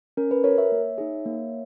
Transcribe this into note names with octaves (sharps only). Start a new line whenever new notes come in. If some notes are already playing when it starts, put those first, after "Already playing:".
C#4 A#4
B4
F#4 A#4 C#5
C#5 E5
A#3
D#4 G#4
A#3